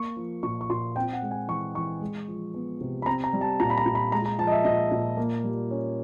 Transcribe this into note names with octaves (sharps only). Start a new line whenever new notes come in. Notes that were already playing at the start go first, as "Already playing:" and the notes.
Already playing: A#3 C#6
F3
A#2 C#6
C#6
A#2 C6
C4 G5
F#5
G#3
G#5
E3 C#6
E3 C#6
G#3
F3
B3
C3
B5
C4 A#5
A#5
G3
A5
A#2 A#5
B5
A#5
A#2
B5
G#3 A#5
A#5
F3 A5
D#5
E5
A#2 D#5
A#2
A#3
G3
C#4